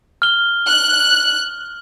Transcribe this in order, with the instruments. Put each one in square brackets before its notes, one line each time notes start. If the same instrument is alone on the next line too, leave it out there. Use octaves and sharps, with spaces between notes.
[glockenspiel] F6 G7
[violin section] F#6